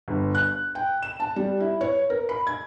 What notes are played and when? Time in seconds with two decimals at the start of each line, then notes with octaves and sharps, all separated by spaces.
0.08 G1
0.35 F#6
0.75 G5
1.03 E7
1.20 A5
1.36 G3
1.60 E4
1.81 C#5
2.10 A#4
2.29 B5
2.47 G#6